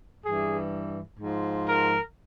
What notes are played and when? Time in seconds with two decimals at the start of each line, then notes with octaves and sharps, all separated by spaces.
0.24 G2 E3 G#4
1.19 G#2 F3
1.66 A#4